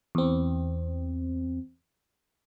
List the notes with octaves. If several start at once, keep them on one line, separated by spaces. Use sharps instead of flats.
E2 C4